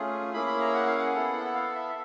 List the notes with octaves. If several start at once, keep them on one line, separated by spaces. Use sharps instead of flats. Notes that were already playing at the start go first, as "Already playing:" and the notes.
Already playing: A3 C#4 F4 G#4
A#3 C#4 E4 G#4 B5
B5
A#5
F#5
F5
F#5
B3 E4 A4
F#5
F5
E5
E5